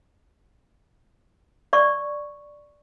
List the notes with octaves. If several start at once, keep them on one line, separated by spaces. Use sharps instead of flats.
D5 C#6